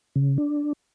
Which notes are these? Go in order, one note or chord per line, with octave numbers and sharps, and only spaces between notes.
C#3
D4